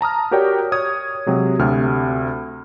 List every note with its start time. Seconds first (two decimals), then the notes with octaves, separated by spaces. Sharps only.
0.01 A5 A#5 D#6 F6
0.31 F#4 G4 A#4 C#5 D5 G5
0.72 C#5 D#6 G#6
1.26 C3 F#3 G#3
1.59 D2 C3 F6